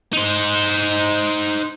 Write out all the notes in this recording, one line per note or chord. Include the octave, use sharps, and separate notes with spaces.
D#4 C5